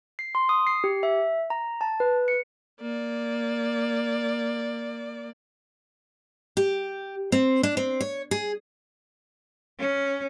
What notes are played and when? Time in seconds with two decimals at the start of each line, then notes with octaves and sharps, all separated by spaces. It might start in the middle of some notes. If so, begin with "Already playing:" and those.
0.19 C7
0.35 C6
0.49 D#6
0.67 C7
0.84 G4
1.03 E5
1.50 A#5
1.81 A5
2.00 B4
2.28 C#7
2.81 A#3 D5
6.57 G4
7.32 C4
7.63 D4
7.77 C4
8.01 C#5
8.31 G#4
9.79 C#4